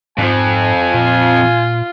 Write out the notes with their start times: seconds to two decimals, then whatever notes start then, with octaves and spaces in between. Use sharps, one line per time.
0.18 F2 G#2 F3 G#5
0.94 A#2 F4